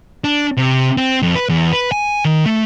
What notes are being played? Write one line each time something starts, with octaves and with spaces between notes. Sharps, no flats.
D4
C3
C4
F2
B4
E2
B4
G#5
D#3
A3